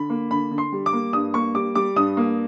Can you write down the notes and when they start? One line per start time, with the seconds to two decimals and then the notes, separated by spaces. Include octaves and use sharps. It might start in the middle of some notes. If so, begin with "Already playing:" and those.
Already playing: D3 B5
0.10 A#3
0.31 D3 B5
0.51 D3
0.58 C6
0.72 G3
0.86 D6
0.93 A#3
1.13 G2 D#6
1.34 A#3 C#6
1.55 G3 D6
1.75 G3 D6
1.96 G2 D#6
2.17 A#3